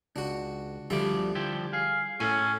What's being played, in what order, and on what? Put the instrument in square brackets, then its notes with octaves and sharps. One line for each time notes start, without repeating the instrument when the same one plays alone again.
[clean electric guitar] C#2 [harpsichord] D4 F#4
[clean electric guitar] D2 F3 D5 [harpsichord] D3 G3 E5
[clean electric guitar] F3 E4 G4
[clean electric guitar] G#4 [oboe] F5
[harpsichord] A2 [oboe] C#4 [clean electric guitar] A4 G#5